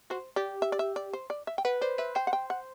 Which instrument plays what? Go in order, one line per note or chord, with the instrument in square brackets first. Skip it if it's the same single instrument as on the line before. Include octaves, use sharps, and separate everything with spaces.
[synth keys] F#4 [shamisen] C5
[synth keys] G4 [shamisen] D5
[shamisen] E5
D5
E5
D5
C5
D5
E5
G5
[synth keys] B4 [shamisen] F#5
[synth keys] C5 [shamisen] D5
[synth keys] B4 [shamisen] E5
[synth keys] C5 [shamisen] G5
[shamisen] F#5
G5
F#5